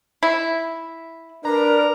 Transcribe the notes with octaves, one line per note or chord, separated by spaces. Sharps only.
E4
D4 A#4 B4 D5 A#5